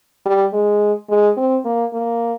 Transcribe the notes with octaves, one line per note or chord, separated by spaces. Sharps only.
G3
G#3
G#3
C4
A#3
A#3